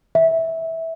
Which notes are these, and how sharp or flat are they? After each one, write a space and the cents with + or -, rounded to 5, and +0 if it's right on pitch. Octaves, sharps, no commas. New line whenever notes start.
E5 -15